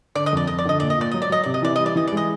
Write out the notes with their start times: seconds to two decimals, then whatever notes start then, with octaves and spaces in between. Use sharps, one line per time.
0.15 D3 D5
0.26 D#5
0.33 F2 D5
0.47 F2 D#5
0.59 D5
0.65 D3 D#5
0.80 A#2 D5
0.90 D#5
0.98 A#2 D5
1.11 F#3 D#5
1.22 D5
1.30 F#3 D#5
1.43 C3 D5
1.54 D#5
1.62 E3 D5
1.76 G3 D#5
1.86 D5
1.96 E3 D#5
2.07 D5
2.12 G#3 D#5